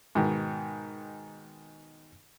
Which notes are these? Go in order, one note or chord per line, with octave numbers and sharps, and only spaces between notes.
G#2 B2 D#3